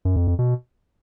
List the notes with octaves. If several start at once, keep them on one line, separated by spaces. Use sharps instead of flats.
F#2
F2
F2
B2